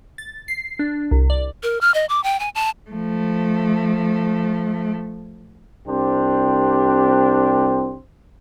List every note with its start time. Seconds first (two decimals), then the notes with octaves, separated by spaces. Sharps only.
0.18 A6
0.48 C7
0.79 D4
1.11 C2
1.30 D5
1.63 A#4
1.81 F6
1.94 D#5
2.09 D6
2.24 G5
2.40 G#5
2.55 A5
2.90 F3 A3
5.87 C2 C4 D4 G4 C5